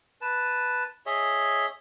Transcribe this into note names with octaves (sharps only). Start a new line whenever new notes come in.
B4 A5
G#4 C#5 D#5 E5